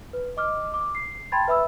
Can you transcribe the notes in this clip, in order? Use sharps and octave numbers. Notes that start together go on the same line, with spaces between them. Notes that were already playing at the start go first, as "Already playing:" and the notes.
B4
D#5 D6 F6
D6
C7
G5 A5 B5 C6 G#6 A6
B4 E5 B5 D#6 E6